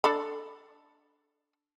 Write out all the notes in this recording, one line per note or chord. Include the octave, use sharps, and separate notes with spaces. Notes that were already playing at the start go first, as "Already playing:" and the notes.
D4 A4 B5